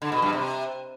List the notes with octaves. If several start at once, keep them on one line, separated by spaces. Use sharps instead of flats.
D3
B2
G2
C3